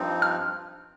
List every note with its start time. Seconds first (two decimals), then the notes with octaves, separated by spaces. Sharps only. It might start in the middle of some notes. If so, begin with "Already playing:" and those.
Already playing: G2 F3 C4 D#4
0.22 F6